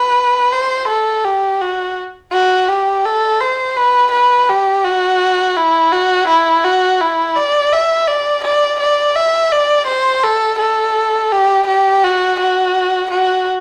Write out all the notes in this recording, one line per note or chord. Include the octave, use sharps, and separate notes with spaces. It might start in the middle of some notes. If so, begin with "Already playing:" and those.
Already playing: B4
C5
A4
G4
F#4
F#4
G4
A4
C5
B4
B4
G4
F#4
E4
F#4
E4
F#4
E4
D5
E5
D5
D5
D5
E5
D5
C5
A4
A4
G4
G4
F#4
F#4
F#4